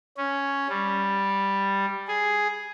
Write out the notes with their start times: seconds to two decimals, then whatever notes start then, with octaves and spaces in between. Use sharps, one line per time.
0.17 C#4
0.69 G3
2.08 G#4